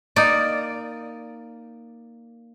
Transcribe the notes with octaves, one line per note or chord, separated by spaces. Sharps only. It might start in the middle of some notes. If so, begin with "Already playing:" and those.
A#3 D#4 A#4 D5